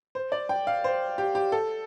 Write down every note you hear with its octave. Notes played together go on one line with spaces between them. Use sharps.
C5
D5
G5
F5
C5
G4
G4
A4